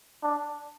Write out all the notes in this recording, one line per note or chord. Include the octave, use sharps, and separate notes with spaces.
D4